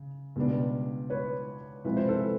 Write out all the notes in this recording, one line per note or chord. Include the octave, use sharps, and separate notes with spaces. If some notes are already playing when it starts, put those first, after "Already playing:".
Already playing: C#3
C#2 B2 G3 B3 D4
B4 C#5
C3 F3 G#3 C4 E4 B4
C5
A4 B4